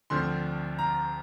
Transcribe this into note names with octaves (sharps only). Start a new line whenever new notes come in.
D2 D3 F3 C4 C6
A#5